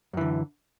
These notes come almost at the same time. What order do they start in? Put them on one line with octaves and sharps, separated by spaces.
F#2 E3 D3